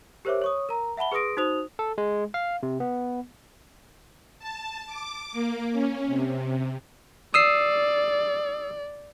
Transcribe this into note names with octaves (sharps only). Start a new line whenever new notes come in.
G4 A#4 C5 C#5 E5 D6
C#5 C#6 D#6
A#4 A#5
E5 F#5 A5 B5 G7
G#4 B4 C6 D#6 A#6 D7
D#4 F#4 C5 D#6 F7
A4
G#3
F5
C3
B3
A5
D6
A#3
C#4
C3
D5 D#6 E6 C7